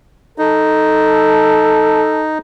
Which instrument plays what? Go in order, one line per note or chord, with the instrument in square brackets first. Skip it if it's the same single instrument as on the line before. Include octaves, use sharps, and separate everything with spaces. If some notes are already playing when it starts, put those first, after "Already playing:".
[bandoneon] D#4 [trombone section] A4